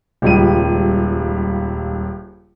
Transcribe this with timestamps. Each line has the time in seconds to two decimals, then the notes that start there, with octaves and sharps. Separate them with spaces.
0.22 D#1 C#2 G3 D#7